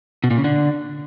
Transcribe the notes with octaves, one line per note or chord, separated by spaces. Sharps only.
B2
A#2
C#3
D3